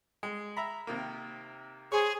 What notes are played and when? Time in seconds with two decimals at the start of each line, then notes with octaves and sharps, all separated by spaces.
0.23 G#3
0.57 E5 A#5 B5
0.87 C3 D#3 A#3
1.92 G#4 C5 C#5